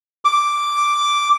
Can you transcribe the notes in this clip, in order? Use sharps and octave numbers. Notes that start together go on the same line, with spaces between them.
D6